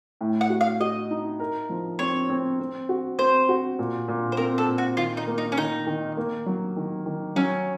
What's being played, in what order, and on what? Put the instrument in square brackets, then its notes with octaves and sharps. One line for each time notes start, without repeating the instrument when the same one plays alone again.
[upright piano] A2
[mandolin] F#5
[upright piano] F#4
[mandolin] F5
[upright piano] F#4 [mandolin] D#5
[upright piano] D#4
A#4
F3
[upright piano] C4 [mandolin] C#5
[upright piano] C4
C4
F#4
[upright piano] C4 [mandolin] C5
[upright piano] F#4
A#2
A#2
[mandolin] C5
[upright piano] C4 [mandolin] A#4
[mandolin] A4
[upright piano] A#2
[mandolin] F#4
[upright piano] D#3 [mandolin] F4
[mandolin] D#4
[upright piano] A#3
[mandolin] D#4
C#4
[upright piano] D#3 [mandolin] D#4
[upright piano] D#3
A#3
F#3
D#3
D#3
[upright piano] F#3 [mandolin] C#4